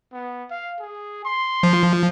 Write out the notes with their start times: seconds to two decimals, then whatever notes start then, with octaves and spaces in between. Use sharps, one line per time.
0.13 B3
0.50 F5
0.79 G#4
1.25 C6
1.63 F3